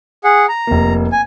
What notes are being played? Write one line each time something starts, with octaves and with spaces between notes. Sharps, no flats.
G#4 F#5
A#5
F1 A#3
G#5